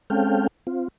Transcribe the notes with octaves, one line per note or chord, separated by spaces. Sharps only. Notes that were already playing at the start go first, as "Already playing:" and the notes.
G#3 C4 C#4 A4 F5 G5
C4 F4